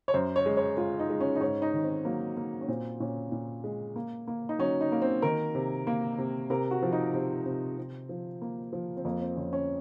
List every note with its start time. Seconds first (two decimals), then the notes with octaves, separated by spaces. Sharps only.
0.08 C#5
0.14 F#2 C5
0.36 C#5
0.46 G#3
0.57 C#5
0.77 G#3 F4
0.99 D#4
1.10 G#3
1.20 C#4
1.35 D#4
1.41 G#2 C#4
1.62 D#4
1.73 D#3
1.84 C4
2.05 F#3 A#3
2.37 A#3
2.61 C#4
2.68 A#2 C4
3.00 A#2 C#4
3.32 A#2
3.64 G#3
3.96 A#3
4.27 A#3
4.49 D#4
4.59 F#3 C#4
4.81 D#4
4.92 A#3
5.02 C4
5.22 D#3 A#4
5.55 C3
5.87 A#3
6.18 C3
6.50 C3 A#4
6.71 F#4
6.82 F3
6.92 D#4
7.13 C3 C4
7.46 C3
7.78 C3
8.09 F3
8.42 A#3
8.73 F3
8.97 C4
9.05 F2 A#3
9.21 C4
9.36 F2 C#4
9.53 C#4